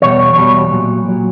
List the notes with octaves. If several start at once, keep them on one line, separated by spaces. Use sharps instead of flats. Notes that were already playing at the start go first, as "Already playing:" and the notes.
E2 B2 G3 C#5
E2 B2 G3
A#2 F#3
A#2 F#3